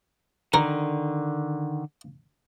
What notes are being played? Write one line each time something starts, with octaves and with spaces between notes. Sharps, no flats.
D3 D#3 A#4